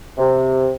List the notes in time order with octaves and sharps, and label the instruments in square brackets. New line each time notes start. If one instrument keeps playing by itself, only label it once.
[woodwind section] C3